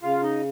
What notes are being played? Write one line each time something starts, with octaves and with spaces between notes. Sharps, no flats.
C#3 F4 F5
D#4 D#5